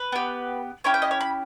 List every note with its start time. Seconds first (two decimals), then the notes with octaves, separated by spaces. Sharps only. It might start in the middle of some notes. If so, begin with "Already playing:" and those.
Already playing: B4
0.12 B3 G4
0.84 C#4 E4 G4 C#5
0.94 G5
1.02 D#5
1.11 C#5
1.21 B5